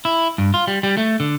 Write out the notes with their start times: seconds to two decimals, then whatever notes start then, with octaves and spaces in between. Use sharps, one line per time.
0.05 E4
0.38 G2
0.54 F4
0.68 G3
0.83 G3
0.97 A3
1.20 D3